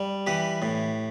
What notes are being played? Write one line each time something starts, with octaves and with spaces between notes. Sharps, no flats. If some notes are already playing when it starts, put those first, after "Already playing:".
Already playing: G3
E3 G4 B4
A2